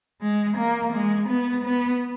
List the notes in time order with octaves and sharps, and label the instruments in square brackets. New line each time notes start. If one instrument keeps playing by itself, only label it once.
[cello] G#3
A#3
G#3
B3
B3